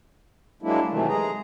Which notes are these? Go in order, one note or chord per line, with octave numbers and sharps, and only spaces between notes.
F#3 G#3 A#3 D4 E4
C3 D#3 E3 F#3 A3
G#3 G#4 A#5